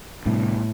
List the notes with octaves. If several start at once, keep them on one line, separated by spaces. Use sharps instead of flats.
A2 C3 G3 B3 D4